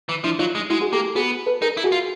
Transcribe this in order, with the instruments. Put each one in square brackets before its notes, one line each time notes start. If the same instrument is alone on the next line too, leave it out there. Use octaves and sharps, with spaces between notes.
[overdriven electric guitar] E3
[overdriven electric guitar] F3 [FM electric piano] D4 E4
[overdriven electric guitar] F#3 [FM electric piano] D#4 F4
[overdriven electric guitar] G#3
[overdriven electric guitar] G#3 [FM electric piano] E4 F#4
[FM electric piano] F#4 G#4
[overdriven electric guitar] A#3 [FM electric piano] G4 A4
[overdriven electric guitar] B3 [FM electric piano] F#4 G#4
[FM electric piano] A4 B4
[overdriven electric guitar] D#4 [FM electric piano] G#4 A#4
[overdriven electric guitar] E4
[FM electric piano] F#4 G#4
[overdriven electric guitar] F4